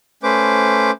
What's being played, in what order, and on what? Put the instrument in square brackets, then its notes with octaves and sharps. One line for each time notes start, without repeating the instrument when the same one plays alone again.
[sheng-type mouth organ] A3 C#4 B4 C5 D6